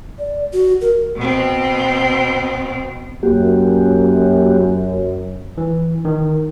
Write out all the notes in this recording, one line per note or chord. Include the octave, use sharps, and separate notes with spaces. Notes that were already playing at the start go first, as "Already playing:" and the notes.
D5
F#4
A#4
B2 C4
F#2 A#3 F#4 G4
E3
D#3